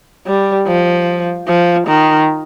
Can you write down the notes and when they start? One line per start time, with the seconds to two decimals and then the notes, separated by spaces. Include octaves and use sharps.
0.26 G3
0.67 F3
1.48 F3
1.88 D#3